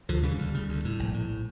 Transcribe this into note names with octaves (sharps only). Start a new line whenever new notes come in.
D2 D3 F3
C#3 E3 G3
D2
C#3
D2
A2
A#1
A2